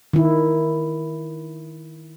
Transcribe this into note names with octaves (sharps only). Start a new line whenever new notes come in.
D#3 E4